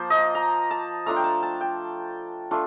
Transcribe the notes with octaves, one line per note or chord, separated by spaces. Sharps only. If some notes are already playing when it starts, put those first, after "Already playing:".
Already playing: F3 A#3 C5
D#5
A#5
A5
A3 D4 F4 A#5
G5
A5
A5
G5
A3 D4 F4